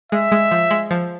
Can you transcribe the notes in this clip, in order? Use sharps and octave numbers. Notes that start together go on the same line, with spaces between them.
G#3 E5
G#3
F3
G#3
F3